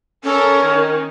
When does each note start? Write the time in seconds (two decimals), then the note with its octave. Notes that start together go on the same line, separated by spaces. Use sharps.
0.24 C#4 A4 A#4
0.62 D#3